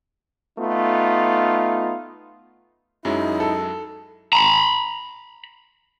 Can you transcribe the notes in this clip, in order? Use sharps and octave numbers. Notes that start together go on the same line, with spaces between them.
A3 B3 D#4 F4
F#2 F#3 G#3 D#4 E4
A4
A#5 B5